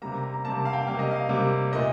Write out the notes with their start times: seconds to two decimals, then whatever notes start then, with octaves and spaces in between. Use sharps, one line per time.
0.02 C3 G3 A#3 A#5
0.23 A#5
0.34 A#5
0.44 C3 G3 A#3 A5
0.59 A5
0.65 F5
0.73 G5
0.87 C3 G3 A#3 F5
0.99 D#5
1.11 F5
1.29 C3 G3 A#3
1.72 A#2 A3 D#5